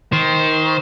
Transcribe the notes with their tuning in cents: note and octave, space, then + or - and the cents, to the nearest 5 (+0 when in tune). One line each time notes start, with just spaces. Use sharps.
D#3 +20 C5 +0